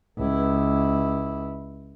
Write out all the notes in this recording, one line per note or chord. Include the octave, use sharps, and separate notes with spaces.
C#2 E4